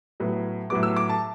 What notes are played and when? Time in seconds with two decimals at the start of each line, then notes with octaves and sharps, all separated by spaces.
0.20 A2 F#3 B3
0.70 A2 F#3 B3 D6
0.83 E6
0.96 D6
1.09 A5